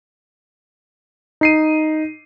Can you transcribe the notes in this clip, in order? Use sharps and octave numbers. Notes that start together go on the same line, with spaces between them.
D#4 C7 D#7